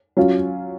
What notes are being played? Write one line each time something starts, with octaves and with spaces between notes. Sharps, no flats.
F#3 C#4 F4